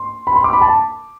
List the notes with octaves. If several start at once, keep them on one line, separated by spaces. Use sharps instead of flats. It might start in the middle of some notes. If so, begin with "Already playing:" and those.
Already playing: C6
B5
C6
D6
B5
A5